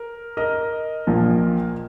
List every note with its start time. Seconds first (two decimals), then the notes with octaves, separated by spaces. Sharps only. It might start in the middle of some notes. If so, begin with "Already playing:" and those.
Already playing: A#4
0.37 A#4 D#5
1.07 A#1 A#2 F3